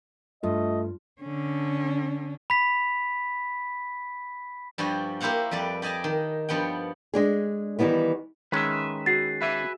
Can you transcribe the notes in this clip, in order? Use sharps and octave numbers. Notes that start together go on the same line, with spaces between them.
G2 A3 F4 D#5
D3 C#4
B5 B6
G2 F3 G3 F#4 G#5
A#3 E4 G4 C5 F5 F#5
F2 G3 B4 D5
G4 D5 D#5 G#5 A5
D#3
G2 F3 B3 F#5 G5
G#3 D4 G#4
D#3 E3 G3 B3 E4
D#3 G#3 C#4 B4 E5
F#4 G#4 A6 C7
B4 E5 G#5